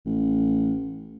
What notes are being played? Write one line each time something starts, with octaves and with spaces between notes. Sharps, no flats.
A1